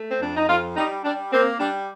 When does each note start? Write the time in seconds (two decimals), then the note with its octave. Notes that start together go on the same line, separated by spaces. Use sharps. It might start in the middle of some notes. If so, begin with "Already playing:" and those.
Already playing: A3
0.10 C4
0.20 F2 D4
0.36 D#4
0.48 F2 F4
0.76 G3 D#4
1.04 G3 D4
1.33 A#3 C4
1.59 G3 D4